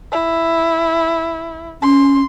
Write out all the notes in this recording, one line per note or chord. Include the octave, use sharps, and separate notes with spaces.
E4
C#4 C6